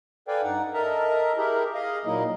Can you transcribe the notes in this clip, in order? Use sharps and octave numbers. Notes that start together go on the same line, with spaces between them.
A4 B4 D5 F5 G5 G#5
G2 D#4 F#5
A4 A#4 D#5 E5 A5 A#5
E4 G4 G#4 A#4 E5
G#4 D#5 F5
A#2 F#3 A#3 D#4 E4 D#5